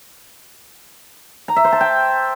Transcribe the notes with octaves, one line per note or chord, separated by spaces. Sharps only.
A#5
E5
C5
A5
G5